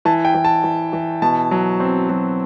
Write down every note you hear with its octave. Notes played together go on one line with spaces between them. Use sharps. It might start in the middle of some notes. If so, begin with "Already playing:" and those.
E3 A5
G5
E3
A5
E3
E3
B2 A5
F#3
C4
F#3